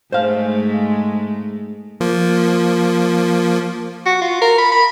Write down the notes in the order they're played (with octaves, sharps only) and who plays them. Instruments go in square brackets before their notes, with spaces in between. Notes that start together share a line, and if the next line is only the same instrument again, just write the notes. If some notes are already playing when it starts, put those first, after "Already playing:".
[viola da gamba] G#2 G#3 A3 [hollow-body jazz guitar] C5 F5
[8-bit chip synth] F3 A#3
[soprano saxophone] F#4
F4
A#4
B5
B5